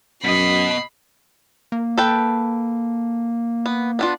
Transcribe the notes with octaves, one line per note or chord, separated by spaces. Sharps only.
F#2 B2 D#5 B5 B6 C7
A#3
A4 B4 G5
B3
B3 D4 F4